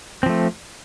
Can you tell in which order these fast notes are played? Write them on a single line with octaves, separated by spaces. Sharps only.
C4 F3 A3